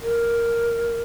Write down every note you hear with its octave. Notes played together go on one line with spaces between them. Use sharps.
A#4